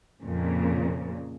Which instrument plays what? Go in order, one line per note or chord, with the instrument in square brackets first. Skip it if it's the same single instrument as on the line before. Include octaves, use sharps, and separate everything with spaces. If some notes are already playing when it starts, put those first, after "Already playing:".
[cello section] F2 A#2 C#3